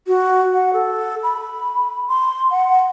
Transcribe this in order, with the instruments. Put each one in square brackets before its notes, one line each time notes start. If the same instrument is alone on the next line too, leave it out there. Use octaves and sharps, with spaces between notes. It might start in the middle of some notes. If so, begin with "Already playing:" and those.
[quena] F#4
F#5
A4
B5
C6
F#5